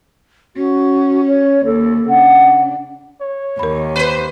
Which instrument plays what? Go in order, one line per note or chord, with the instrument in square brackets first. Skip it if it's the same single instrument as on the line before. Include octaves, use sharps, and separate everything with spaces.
[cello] C#4 [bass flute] F#4
[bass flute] C#5
[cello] D#2 [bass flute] A4
[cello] C#3 D4 [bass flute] F#5
[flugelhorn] C#5
[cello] D#2 [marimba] A#4 B5
[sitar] B4 C5